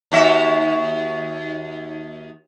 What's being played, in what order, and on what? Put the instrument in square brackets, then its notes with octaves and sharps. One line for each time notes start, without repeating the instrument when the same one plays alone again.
[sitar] D#2 F#4 E5